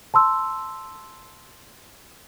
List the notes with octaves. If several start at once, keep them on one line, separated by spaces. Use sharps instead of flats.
A5 C6 E6